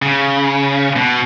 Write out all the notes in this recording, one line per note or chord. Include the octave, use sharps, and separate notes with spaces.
C#3
B2